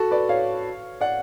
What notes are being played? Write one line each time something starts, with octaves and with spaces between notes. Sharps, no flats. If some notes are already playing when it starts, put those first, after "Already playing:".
Already playing: F#4 A4
B4 D5
C#5 F5
D5 F#5